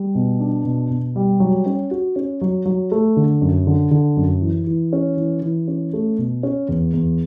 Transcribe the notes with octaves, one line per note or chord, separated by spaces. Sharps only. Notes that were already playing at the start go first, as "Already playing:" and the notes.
Already playing: G3
B2
D4
B2
B2
G3
F#3
C#4
F#4
C#4
F#3
F#3
A3
D3
F#2
D3
D3
F#2
E3
E3
C#4
E3
E3
C#4
A3
B2
C#4
E2
E2